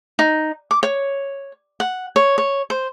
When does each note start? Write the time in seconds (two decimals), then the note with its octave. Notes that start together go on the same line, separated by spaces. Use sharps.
0.19 D#4
0.71 D6
0.83 C#5
1.80 F#5
2.16 C#5
2.38 C#5
2.70 C5